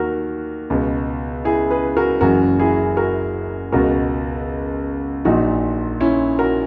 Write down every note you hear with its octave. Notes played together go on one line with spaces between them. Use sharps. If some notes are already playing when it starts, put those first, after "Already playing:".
Already playing: D#2 D#3 F#4 A#4
C#2 B2
E4 G#4
G#4 B4
F#4 A#4
F#1 F#2 C#3 E3 F#4 A#4
E4 G#4
F#4 A#4
C#2 B2 F#4 A#4
A#1 A#2 D#4 F#4
C#4 E4
F#4 A#4